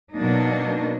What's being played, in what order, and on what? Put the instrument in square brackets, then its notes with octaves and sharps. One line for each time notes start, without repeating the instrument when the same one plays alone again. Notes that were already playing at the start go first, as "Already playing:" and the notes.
[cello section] B2 F#3 A#3 D4 D#4